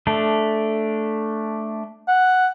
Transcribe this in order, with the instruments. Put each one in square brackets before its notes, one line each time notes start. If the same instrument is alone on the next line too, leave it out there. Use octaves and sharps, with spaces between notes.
[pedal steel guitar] A3 D4
[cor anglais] F#5